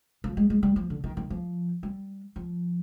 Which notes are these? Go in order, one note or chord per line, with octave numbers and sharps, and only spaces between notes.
F3
G#3
G#3
G3
F3
D3
D#3
D#3
F3
G3
F3